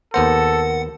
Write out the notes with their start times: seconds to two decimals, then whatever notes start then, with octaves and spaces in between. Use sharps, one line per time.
0.14 D#2 B3 A4 A#4 C5 F#5